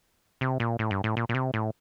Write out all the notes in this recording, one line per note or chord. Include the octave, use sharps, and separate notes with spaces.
C3
A#2
A2
G2
A2
A#2
A#2
C3
A2